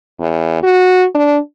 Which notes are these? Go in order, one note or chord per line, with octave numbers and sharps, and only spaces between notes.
E2
F#4
D4